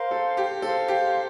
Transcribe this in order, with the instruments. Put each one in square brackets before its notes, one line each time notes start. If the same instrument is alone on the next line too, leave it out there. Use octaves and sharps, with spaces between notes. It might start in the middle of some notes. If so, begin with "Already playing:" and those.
Already playing: [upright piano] A#4 [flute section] C5 F5 C6
[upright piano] A4
G4
[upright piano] A4 [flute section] C5 F5 C6
[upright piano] G4